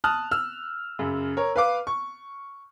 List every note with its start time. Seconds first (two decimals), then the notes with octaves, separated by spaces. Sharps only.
0.04 A5 D#6 F6 F#6
0.31 E6 F6
0.99 F#2 C#3
1.37 A#4 C#5
1.56 B4 F5 D6
1.87 C#6